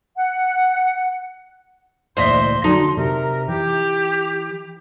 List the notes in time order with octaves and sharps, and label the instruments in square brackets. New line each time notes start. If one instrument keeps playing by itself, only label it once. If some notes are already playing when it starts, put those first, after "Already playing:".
[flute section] F#5
[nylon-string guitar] D2 A#2 E3 [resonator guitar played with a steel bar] C5 D#5 E5 [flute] C6
[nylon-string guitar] D3 F#3 A4 [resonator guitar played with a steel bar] D#4
[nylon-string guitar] C3 [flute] A#4
[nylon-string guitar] E3 [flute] G4